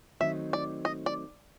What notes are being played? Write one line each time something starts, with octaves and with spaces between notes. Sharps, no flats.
D#3 F#3 A3 C4 D#4 E5
D5
D#5
D5